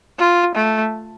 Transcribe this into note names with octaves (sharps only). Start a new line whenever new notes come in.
F4
A3